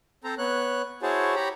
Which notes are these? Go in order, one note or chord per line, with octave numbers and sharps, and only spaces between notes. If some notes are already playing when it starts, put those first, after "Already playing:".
C4 A4 C5 A#5
B3 C#5 F#6
E4 F#4 G#4 C5 C#5 A5
G4 C#5 A#5 B5